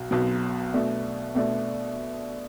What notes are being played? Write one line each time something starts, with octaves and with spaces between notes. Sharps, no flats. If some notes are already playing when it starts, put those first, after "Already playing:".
Already playing: B1 F#3
B1 B2 F#3
B2 A3 D4
B2 A3 D4